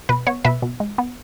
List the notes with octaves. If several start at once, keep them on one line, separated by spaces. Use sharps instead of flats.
B2 B4
B3 C#5
B2 B4 E5
B2
G#3
B3